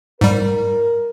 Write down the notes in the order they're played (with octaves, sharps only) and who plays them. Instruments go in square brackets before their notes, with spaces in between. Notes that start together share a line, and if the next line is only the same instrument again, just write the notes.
[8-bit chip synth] G#2 G3 [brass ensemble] A#4